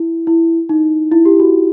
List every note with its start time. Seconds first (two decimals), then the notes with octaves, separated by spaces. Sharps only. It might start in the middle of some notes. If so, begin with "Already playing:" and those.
Already playing: E4
0.27 E4
0.69 D#4
1.12 E4
1.25 G4
1.40 F#4